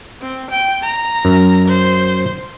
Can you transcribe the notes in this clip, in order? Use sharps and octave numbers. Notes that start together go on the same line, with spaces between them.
C4
G5
A#5
F#2
C5